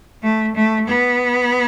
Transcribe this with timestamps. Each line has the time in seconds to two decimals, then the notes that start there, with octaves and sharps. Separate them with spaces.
0.23 A3
0.55 A3
0.88 B3